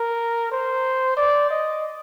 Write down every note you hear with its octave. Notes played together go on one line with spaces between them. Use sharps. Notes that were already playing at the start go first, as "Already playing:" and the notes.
Already playing: A#4
C5
D5
D#5